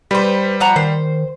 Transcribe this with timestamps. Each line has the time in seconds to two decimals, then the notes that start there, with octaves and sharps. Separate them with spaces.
0.11 G3 B4 C5
0.60 F3 F#5 A#5
0.76 D#3 C5